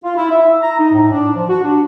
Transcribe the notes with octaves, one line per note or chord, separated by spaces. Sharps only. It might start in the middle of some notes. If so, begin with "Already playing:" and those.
F4
E4
E5
A#5
D#4
A2
D4
F3
F#4
D4